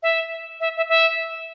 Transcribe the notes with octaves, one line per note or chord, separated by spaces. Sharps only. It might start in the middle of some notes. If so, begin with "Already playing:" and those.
E5
E5
E5
E5